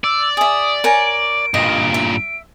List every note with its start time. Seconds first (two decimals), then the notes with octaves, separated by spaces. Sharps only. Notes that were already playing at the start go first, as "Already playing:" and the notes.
0.04 D5 E6
0.37 G#4 E5 D#6
0.84 A#4 C#5 G#5 D7
1.54 G2 A#2 D#5
1.94 E5